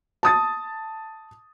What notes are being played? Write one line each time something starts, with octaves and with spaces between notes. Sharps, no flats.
A5 D#6 A6